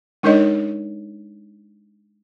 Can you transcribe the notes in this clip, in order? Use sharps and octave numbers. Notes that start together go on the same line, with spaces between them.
G#3 D4 D#4 A#4 C#5 D#5